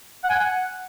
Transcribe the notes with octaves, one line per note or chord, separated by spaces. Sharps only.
F#5
G#5
F#5